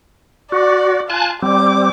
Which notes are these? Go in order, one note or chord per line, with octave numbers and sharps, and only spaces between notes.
F#4 D5
F4 G#5 A5 F#6
G3 C4 D6